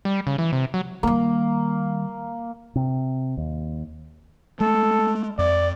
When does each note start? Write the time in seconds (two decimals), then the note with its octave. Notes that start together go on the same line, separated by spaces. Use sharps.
0.05 G3
0.27 C#3
0.38 E3
0.53 C3
0.74 F#3
1.03 D#3 G3 A#3
2.76 C3
3.37 D#2
4.60 G#3 A3 A4
5.38 F2 D5